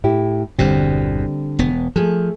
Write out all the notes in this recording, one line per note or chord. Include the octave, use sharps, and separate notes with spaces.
A2 E4 G4
G1 E2 B2 D3 G3 C4
E1 B3
F3 A3 G#4 A4